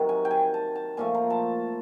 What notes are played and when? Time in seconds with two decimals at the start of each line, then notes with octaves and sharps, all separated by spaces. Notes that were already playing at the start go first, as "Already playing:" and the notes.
Already playing: C3 D#3 F#3
0.09 G#5
0.25 G5
0.31 G#5
0.54 A5
0.76 A5
0.97 A#2 F3 A3 G#5
1.14 A#5
1.30 A5